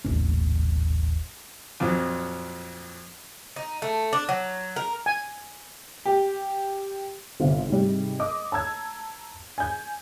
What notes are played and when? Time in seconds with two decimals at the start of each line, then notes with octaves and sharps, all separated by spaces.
0.05 D#1 A1 C#4
1.80 F2 A#2 F3 F#3
3.56 D#4
3.82 A3
4.13 D4
4.29 F#3
4.76 A#4
5.06 G#5
6.05 G4
7.40 G1 C2 C4 F5
7.69 G#2 C3 G3
8.19 D#5 D6 D#6
8.52 A5 A#5 E6 G#6
9.58 G#5 G6